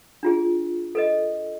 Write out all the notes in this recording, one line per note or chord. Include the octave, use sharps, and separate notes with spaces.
D4 F4 G#4
A4 B4 D#5